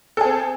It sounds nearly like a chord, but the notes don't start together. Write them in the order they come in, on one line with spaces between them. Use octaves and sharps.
A4 G#4 C4